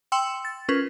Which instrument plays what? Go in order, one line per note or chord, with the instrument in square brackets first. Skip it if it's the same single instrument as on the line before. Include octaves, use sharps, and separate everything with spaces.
[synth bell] G5 C6 E6 C#7 E7 F#7
A6
C#4 F4 A#4 B4